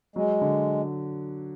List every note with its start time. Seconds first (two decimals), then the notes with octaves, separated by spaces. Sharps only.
0.16 F#3 G#3
0.41 D3